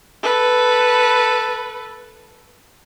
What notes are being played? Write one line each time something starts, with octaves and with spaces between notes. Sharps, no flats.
A4 B4